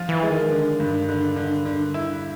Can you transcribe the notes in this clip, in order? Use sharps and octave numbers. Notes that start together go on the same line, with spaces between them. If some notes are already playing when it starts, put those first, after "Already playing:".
Already playing: F3 F4
E3
G#3
D#3
D3
G2
D3
D3
D3
E4